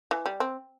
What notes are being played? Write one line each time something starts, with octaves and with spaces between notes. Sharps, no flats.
E3
G3
C4